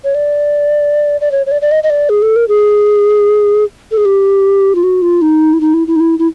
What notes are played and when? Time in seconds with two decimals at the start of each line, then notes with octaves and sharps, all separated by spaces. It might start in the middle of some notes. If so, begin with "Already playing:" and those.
0.04 C#5
0.14 D5
1.21 D5
1.32 C#5
1.46 C#5
1.51 D5
1.61 D5
1.71 D#5
1.83 D#5
1.90 D5
2.09 G#4
2.22 A4
2.36 A#4
2.48 G#4
3.91 A4
3.97 G#4
4.05 G4
4.75 F4
4.83 F#4
5.02 F4
5.21 D#4
5.53 E4
5.60 D#4
5.74 E4
5.87 E4
5.96 D#4
6.00 E4
6.19 E4